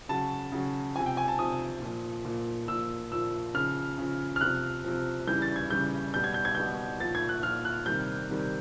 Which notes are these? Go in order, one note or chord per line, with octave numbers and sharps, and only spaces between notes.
C#3 F#3 A5
C#3 F#3
C3 F3 G#5
G5
G#5
A5
C3 F3 D#6
A#2 F3
A#2 F3
A#2 F3 E6
A#2 F3 E6
C#3 F3 F6
C#3 F3
F6
C3 F3 F#6
C3 F3
C#3 E3 G3 G6
A6
G#6
C#3 E3 G3 G6
B2 G3 G6
G#6
G6
G#6
B2 G3 G6
A#2 F3 A6
G#6
F#6
A#2 F3 F6
F#6
C3 D#3 G3 G6
C3 D#3 G3